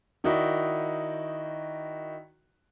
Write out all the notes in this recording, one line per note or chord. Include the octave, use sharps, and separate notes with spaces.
D#3 D#4 E4 F#4 D5